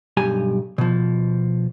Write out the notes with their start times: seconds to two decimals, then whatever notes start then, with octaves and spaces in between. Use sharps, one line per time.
0.17 B1 G2 G4 G#5
0.78 B2 F3